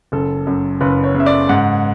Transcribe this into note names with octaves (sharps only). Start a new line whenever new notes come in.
F#1 A4
F#2
F#1 B4
C#5
C#3
E5
D5
G#2 F#5